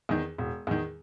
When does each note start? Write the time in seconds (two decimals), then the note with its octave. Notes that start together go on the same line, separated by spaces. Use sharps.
0.09 E2 D#3
0.38 E1
0.67 E2 D#3